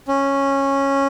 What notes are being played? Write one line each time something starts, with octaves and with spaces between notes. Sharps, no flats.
C#4